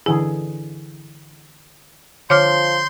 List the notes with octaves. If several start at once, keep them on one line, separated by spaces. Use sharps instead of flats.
D3 E3 E4 G#4
D3 F3 C#5 C6 D6 F6 G6